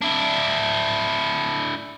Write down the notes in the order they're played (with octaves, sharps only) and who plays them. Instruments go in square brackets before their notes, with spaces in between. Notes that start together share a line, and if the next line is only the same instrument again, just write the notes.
[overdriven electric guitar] D4 E4